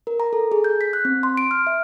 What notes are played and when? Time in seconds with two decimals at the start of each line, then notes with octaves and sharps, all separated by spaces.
0.07 A#4
0.20 A#5
0.33 A4
0.52 G#4
0.64 G6
0.81 B6
0.93 F#6
1.05 C4
1.23 C6
1.37 D7
1.51 F6
1.67 E5